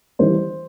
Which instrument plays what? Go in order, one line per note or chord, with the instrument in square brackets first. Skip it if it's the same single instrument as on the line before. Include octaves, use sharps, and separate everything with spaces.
[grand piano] E3 G3 C5